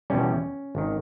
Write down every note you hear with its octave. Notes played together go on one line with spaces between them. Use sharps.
E2 B2 G3 C#4
G#1 D#3